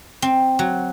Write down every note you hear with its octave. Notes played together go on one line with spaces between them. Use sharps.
C4
F#3